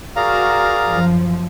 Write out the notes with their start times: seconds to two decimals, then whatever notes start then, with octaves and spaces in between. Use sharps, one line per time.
0.16 F#4 G#4 A#4 D5 F5 A#5
0.90 F#2 F3